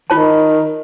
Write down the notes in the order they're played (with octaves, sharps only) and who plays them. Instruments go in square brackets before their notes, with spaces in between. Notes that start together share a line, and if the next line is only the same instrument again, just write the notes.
[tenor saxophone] D#3 [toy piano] F4 C#5 A5